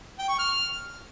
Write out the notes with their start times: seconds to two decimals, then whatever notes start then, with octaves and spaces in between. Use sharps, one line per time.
0.18 G5
0.29 C#6
0.39 F6